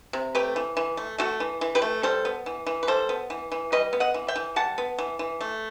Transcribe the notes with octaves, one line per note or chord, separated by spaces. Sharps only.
C3
A3 G4 B4
E3
E3
A3
A3 F#4 A4
E3
E3
G4 B4
A3
G3 A4 C5
B3
E3
E3
B4
G3 A4 C5
B3
E3
E3
G3 B4 D#5
B3
D#5 F#5
E3
E5 G5
E3
G3 F#5 A5
B3
E3
E3
A3